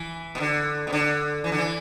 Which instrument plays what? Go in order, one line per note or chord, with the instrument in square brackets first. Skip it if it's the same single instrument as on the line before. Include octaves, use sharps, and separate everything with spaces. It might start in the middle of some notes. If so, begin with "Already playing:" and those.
Already playing: [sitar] E3
B2
D3
B2
D3
E3
D3
E3